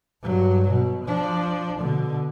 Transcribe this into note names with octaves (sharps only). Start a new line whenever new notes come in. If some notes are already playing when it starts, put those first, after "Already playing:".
G2 F#3
B2
F3 D4
B2 D3